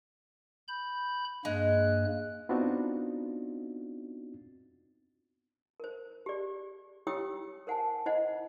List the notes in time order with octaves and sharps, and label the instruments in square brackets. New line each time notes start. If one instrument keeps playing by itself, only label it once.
[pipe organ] B5 G6
[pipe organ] G2 A#3 F#6 [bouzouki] G#3
[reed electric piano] B3 C4 D4 D#4 F4 F#4
[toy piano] A#4 C5
G4 G#4 D5
E4 G4 C#5 G5 D#6 E6
A#4 C5 F#5 G#5 A5
E4 C5 D#5 F#5